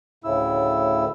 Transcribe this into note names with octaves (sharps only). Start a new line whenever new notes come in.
D2 A2 C#3 E4 E6